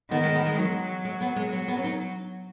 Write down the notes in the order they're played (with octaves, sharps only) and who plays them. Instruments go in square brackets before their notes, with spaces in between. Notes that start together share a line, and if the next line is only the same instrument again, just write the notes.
[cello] D#3 [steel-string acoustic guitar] B3
[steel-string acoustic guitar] G#3
B3
G#3
[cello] F#3
[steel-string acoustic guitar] G#3
B3
G#3
[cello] F#3 [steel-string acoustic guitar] B3
[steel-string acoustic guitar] B3
C#4
D#4